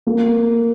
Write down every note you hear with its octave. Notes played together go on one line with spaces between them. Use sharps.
A#3